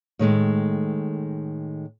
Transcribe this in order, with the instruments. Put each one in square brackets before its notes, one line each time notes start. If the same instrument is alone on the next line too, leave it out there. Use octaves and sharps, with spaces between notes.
[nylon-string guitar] A2 D#3 G#3 A3